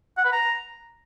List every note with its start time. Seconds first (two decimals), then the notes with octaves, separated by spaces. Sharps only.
0.17 F#5
0.25 B4
0.32 A#5